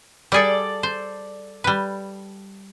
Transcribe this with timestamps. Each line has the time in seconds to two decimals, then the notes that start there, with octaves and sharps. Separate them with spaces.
0.32 G3 G#4 A4 D5
0.83 C5
1.64 G3 B4